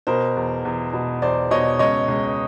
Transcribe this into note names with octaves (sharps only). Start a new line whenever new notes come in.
B2 A#4 C5
E2
E2
B2
E2 C5 D5
B2 C#5 D#5
C#2 C#5 D#5
C#2